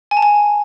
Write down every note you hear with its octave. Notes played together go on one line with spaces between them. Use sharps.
G#5
A5
G#5